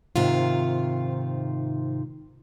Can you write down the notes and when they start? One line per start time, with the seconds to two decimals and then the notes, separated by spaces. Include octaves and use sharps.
0.16 G#2 C3 D#3 F4